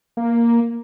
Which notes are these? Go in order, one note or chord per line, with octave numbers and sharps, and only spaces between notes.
A#3